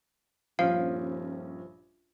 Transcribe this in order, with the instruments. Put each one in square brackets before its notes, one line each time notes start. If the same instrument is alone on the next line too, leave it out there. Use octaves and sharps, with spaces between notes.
[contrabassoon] D#1 [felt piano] A#1 G2 C#4 [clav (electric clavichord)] F3 [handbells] F5